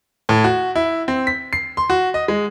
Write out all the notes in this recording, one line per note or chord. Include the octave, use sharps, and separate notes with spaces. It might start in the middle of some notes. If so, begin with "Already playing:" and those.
A2
F#4
E4
C4
B6
C7
C6
F#4
D#5
G#3